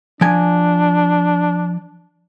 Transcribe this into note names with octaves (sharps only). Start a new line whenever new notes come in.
F3 D4 G#5